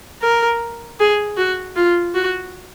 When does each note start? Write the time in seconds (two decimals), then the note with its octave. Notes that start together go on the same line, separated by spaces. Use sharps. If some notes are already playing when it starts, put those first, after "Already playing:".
0.22 A#4
1.00 G#4
1.37 F#4
1.76 F4
2.15 F#4